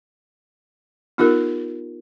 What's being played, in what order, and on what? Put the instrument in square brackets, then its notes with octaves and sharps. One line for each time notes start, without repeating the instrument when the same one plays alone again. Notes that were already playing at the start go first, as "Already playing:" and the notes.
[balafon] B3 D#4 F4 G4 A#4